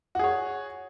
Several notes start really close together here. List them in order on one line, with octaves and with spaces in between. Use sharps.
F#4 G#4 C#5